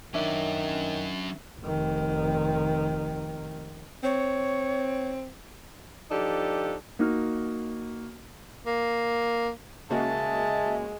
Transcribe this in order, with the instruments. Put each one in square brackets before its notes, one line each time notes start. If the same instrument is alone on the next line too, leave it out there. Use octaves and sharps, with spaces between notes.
[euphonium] D#3 [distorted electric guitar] F#3 C#4 [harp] D4 E5
[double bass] F1 D#3
[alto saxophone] C4 [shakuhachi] C#5
[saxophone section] F3 D4 D#4 G4 A4
[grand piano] A#3 D#4 F#4 F6
[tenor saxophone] A#3
[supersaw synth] C#3 A#3 F#4 [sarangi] G#3 [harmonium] D#5 E5 [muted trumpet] A5